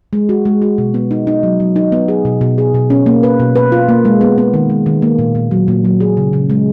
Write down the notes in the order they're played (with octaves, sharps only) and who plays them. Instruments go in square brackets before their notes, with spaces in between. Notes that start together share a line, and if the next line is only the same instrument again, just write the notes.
[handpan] G#3
F#4
G#3
F#4
B2
B3
D#4
D#4
F#3
F#3
D#4
B3
G#4
B2
B2
G#4
B2
C#4
A#3
B4
B2
B4
F4
A#3
G#3
B3
B3
D#3
G#3
D#3
A#3
A#2
A#2
F#3
A#2
F#3
G#4
C#3
C#3
G#3